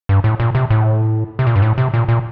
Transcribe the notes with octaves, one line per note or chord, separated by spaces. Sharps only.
G2
A2
A#2
C3
A2
C3
A#2
G2
A2
C3
A#2
A#2